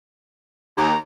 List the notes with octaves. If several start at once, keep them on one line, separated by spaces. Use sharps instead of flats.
D#2 A#5